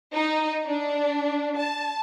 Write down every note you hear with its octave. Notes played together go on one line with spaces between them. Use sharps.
D#4
D4
A5